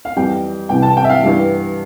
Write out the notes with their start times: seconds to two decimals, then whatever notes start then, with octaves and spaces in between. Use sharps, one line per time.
0.05 F5
0.16 F2 E3 G3 G5
0.69 C2 C3 E3 G3 G5
0.82 A5
0.97 G5
1.04 E5
1.09 F5
1.23 G2 E3 G3